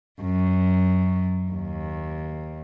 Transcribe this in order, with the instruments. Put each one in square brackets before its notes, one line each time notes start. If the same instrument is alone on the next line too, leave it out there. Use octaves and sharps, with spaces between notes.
[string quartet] F#2
D#2